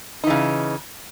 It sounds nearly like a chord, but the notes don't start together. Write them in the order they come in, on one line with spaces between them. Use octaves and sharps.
D#4 E3 C#3